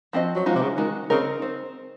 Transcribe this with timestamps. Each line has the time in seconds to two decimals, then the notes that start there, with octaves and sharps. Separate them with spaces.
0.13 F3 C4 F#4 C5 D#5
0.35 F#3
0.46 F3 G#3 D#4 F#4
0.55 C3
0.62 C#3
0.78 D#3 G#3 D#4 F#4
1.10 C#3 C4 D#4 A#4
1.42 C4